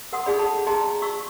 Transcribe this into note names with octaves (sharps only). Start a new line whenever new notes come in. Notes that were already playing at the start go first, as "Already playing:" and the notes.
A#4 F#5 C6 D#6
D#4 F#4 G#4 D5 B5
G#4 A4 A5 B5
G#4 D#5 A5 A#5 C6
F#4 C#6 E6